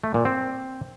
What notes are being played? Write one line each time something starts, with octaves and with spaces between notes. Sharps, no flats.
A3
A#2
C4